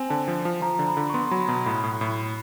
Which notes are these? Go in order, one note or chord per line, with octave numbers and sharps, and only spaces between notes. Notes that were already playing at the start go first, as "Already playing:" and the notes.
Already playing: C4 G#5
D3 A5
F3
F3
F3 A#5
D3
B5
D3
C#6
B3 C6
F#3 B5
B2 A#5
A2 B5
A2
A2